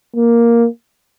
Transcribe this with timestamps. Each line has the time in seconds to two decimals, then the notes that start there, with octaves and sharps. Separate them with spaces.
0.16 A#3